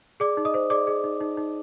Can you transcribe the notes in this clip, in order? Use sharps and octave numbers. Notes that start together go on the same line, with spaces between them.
G#4 D5 D6
D#4
D#5 D#6
C5
G#4 D5 D6
G#4
D#4
D#4
D#4